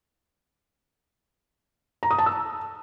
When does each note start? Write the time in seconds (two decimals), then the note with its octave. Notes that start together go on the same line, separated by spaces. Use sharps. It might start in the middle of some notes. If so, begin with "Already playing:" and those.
2.03 A#5
2.11 D#6
2.18 A5
2.26 E6